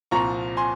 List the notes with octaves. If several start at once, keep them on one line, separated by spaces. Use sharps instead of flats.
C2 A#2 F3 A#5 C#6
G#5 C6